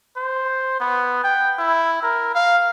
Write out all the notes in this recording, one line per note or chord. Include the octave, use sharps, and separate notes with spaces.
C5
B3
G5
E4
A#4
F5